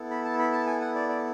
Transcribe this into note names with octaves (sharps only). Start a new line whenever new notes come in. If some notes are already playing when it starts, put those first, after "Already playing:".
Already playing: B3 E4 A4
B5
A5
B5
A5
G#5
F#5
D5
D5